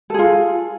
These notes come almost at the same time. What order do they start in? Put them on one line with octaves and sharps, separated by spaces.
A4 G#4 F4